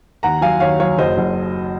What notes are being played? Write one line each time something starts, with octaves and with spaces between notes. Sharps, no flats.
D#2 F#5 A#5
F#3 F5 G#5
D#2 C#5 F5
F#3 C#5 F5
F#1 C5 D#5
F#1